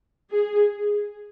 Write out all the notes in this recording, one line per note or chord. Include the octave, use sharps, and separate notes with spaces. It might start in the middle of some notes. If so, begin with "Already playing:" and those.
G#4